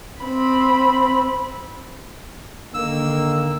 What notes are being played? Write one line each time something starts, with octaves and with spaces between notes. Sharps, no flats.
C4 B5
D3 D#3 A#3 E6